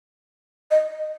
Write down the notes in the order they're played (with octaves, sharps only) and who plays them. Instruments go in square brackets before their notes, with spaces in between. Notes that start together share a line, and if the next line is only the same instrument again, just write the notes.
[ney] D#5